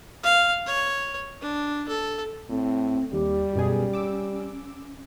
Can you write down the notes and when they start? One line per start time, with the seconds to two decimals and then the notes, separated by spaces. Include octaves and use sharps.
0.23 F5
0.66 C#5
1.41 D4
1.88 A4
2.49 A2 C4
3.13 D#2 G3 G4
3.55 F#2 B2 C#4 G#4
3.93 D6 E6